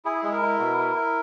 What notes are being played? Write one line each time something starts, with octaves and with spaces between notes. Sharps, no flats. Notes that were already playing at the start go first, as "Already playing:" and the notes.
E4 G#4
G#3 G#4
A#4
E4
B2
E4
E4